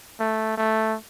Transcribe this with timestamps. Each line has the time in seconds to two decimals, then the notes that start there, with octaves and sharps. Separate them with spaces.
0.20 A3
0.58 A3